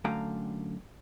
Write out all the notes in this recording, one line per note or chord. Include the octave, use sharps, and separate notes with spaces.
F#2 D3 A3 F5 G5 A#5